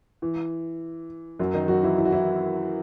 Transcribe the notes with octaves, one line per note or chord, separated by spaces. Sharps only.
E3
F#2 F#3
D#3 D#4
F#3 F#4
E3 E4
E4
F#4
E3 E4